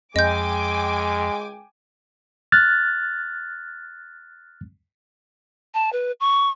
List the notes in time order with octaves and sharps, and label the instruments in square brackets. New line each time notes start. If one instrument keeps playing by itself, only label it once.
[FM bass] F2 [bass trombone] G#3 [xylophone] D#5 G6 [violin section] G5 G#5 D6
[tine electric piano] F6 F#6 A6
[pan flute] A5
B4
C#6